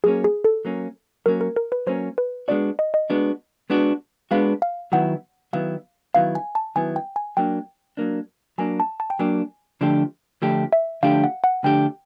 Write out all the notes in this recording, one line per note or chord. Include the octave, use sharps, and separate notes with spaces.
F#3 A#3 C#4 G#4
G#4
A4
F#3 A#3 C#4
F#3 A#3 C#4 A#4
A#4
A#4
B4
F#3 A#3 C#4 C5
B4
G#3 B3 D4 F#4 D5
D#5
D#5
G#3 B3 D4 F#4
G#3 B3 D4 F#4
G#3 B3 D4 F#4 F5
F5
D#3 F#3 B3 E4 F#5
D#3 F#3 B3 E4 F5
D#3 F#3 B3 E4 F5
G#5
A5
D#3 F#3 B3 E4 G#5
G5
G#5
F#3 A#3 D4 G5
F#3 A#3 D4
F#3 A#3 D4 G#5
A5
A5
G5
F#3 A#3 D4 G#5
D3 F3 A3 D4 G4
D3 F3 A3 D4 G4
E5
D3 F3 A3 D4 G4 F5
F#5
F#5
D3 F3 A3 D4 G4 G5